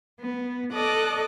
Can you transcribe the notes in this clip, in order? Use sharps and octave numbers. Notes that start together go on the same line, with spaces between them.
B3
A4 D5 D#5 D6 F#6